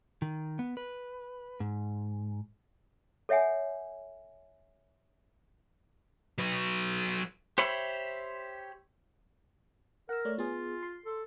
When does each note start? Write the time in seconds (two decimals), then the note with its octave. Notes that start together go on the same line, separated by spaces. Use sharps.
0.22 D#3
0.59 B3
0.77 B4
1.60 G#2
3.29 A4 C#5 E5 F#5 G#5
6.38 F#3 B4
7.58 G4 C5 C#5 E5 B5
10.09 A#4 F#5 E6
10.25 A3 C#5 D5
10.38 B3 F4 G#4
10.83 C6
11.05 A4